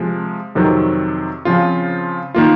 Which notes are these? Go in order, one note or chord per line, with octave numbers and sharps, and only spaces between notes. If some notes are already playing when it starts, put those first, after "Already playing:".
Already playing: C3 F3 G#3
F2 C3 D#3 F#3 C4
C#3 F3 C4 F4
D#3 A#3 F4